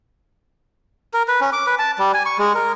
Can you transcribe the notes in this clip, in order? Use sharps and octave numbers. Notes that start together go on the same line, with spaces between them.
A#4
B4
C#4
D6
B4
A5
G3
G#5
C#6
G#3
A#4